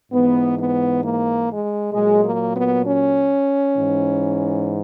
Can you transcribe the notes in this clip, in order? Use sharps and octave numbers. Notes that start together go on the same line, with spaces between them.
G#2 E3 B3
B3
A#3
G#3
A#2 F#3 G#3
A#3
B3
C#4
G#2 E3